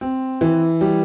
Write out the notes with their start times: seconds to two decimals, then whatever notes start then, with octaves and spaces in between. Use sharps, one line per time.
0.01 C4
0.41 E3
0.81 G3